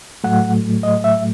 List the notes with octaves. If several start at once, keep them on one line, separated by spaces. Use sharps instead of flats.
A2 F#3 A3 F#5
D#5
E5